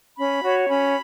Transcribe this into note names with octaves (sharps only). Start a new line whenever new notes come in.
C#4 B5
F#4 C#5
C#4 B5